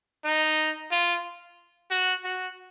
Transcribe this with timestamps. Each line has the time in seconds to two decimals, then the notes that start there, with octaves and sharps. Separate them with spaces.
0.24 D#4
0.91 F4
1.91 F#4
2.24 F#4